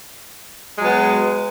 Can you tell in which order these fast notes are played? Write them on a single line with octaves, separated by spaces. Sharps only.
G#3 F#3 B3